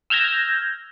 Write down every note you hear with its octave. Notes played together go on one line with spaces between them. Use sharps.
E6 F6 G6 G#6 A#6